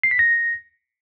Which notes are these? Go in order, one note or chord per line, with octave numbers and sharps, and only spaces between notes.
C7
B6
A#6